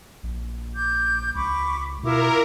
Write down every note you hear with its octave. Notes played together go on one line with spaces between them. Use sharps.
A#1
D6 G6
C#2 B5 C#6 D6
B2 E4 F4 A#4 D6